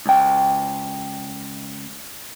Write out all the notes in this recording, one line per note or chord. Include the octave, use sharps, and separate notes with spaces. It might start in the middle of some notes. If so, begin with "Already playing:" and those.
C#2 G5